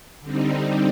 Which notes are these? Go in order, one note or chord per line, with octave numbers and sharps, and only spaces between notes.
D3 G3 C4 D#4